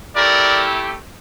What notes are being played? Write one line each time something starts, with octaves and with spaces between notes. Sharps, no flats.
A3 E4 G4 A#4 D5